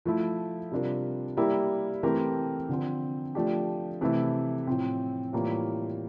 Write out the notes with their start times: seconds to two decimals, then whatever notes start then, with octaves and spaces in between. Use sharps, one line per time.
0.05 F3 A3 E4
0.71 C3 G3 D4 F4 A#4
1.37 G3 A#3 E4 G4 A#4
2.03 E3 A3 C4 G4 A#4
2.69 D3 F3 C4
3.35 F3 A3 D4 G4
4.01 C3 E3 A3 E4
4.67 A2 F3 C4
5.33 A2 E3 G3 A#3 F4